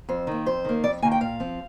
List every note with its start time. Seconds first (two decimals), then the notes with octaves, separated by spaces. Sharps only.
0.09 F2 C5
0.27 D#3 A#3
0.46 F2 C5
0.65 D#3 A#3
0.84 F2 D5
1.02 D#3 A#3 G#5
1.12 G5
1.21 A#2 F5
1.40 F3 C4